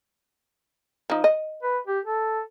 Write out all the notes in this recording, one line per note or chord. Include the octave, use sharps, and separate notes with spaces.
F3 D#4
D#5
B4
G4
A4